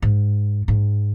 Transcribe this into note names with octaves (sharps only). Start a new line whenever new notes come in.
G#2
G#2